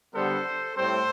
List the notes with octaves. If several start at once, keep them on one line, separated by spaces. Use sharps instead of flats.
D3 G3 B3 A4 C5
A2 G3 C4 A4 C5